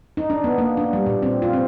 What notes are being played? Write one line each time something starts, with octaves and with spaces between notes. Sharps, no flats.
D#4
D4
B3
A#3
D4
G3
A#2
C4
F4
C4